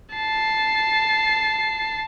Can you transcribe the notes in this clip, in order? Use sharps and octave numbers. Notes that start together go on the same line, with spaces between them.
A5 C7